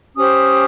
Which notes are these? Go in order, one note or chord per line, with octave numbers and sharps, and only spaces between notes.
C#4 G4 C5 D#6